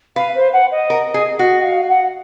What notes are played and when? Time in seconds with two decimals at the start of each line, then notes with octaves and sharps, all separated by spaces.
0.16 B4 F5
0.35 C5
0.53 F#5
0.71 D#5
0.90 A#4
1.14 G#4
1.39 F#4
1.59 F#5
1.64 F5
1.89 F#5